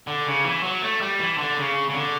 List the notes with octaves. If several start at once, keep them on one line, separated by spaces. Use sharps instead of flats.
D3
C#3
E3
F#3
A3
G3
E3
D3
C#3
C#3
D3